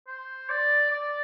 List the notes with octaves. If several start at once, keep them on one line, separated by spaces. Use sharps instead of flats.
C5
D5
D5